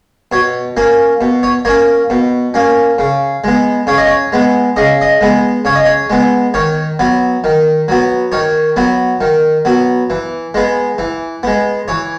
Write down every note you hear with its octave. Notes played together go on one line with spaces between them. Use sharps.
B2 C#5
A#3 C#4
B2
C#5
A#3 C#4 C#5
B2
A#3 C#4
C#3
G#3 B3
C#3 C#5
D#5
C#5
G#3 B3
C#3 D#5
D#5
G#3 B3
C#3 C#5
D#5
C#5
G#3 B3
D#3 C#5
F#3 B3
D#3
F#3 B3
D#3 C#5
F#3 B3
D#3
F#3 B3
E3
G#3 B3
E3
G#3 B3
E3 C#5